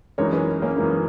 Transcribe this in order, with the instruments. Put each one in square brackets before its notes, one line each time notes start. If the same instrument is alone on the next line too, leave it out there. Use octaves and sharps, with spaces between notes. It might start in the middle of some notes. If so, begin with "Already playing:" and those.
[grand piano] F#2 E3 G#3 D#4 [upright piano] A#4 C#5
[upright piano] G#4 B4
A#3 C#4
[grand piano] F#2 E3 G#3 D#4